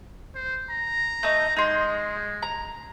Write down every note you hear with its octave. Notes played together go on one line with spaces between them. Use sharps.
C5
A#5
A3 D#4
G#3 D#4 C6
A#5